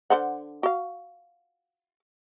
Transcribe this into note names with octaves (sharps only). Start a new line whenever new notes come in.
D3 C5 F#5
F#4 F5